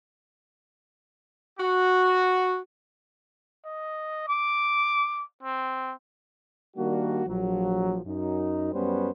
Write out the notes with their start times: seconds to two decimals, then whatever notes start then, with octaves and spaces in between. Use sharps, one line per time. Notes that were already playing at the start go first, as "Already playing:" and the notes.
1.59 F#4
3.65 D#5
4.28 D6
5.43 C4
6.77 D#3 G3 A#3 D4 F#4
7.27 A#1 F3 F#3
8.06 F#2 D#4
8.72 F#2 G3 B3 C#4 B4 C5